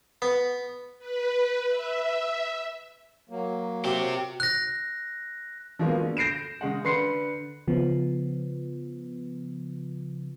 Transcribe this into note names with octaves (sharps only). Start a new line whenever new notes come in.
B3
B4
E5
F#3 A#3
C4 F#4 G4
F#6 A#6
F3 F#3 G#3 A#3 B3
D3
G6 A#6 C7 D7 E7
C#3 G#3 F#5
D3 B4 C6 C7 C#7
C#3 F3 B3